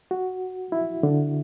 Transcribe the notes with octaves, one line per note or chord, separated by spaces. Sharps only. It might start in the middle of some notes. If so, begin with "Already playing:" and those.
F#4
E4
D3